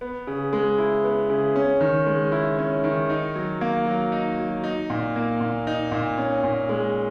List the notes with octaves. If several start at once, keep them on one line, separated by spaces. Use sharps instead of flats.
B3
C#3
G#3
E4
B3
C#3
C#4
D#3
G#3
E4
C#4
D#3
D#4
F#3
A#3
F#3
D#4
F#3
D#4
A#2
A#3
A#2
D#4
A#2
C#4
A#2
G#3